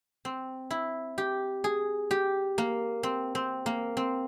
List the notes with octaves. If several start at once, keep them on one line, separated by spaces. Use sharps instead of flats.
C4
E4
G4
G#4
G4
A#3
C4
C4
A#3
C4